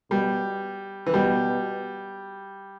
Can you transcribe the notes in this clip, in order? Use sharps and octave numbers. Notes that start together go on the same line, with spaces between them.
B2 G3
E3
B2 G3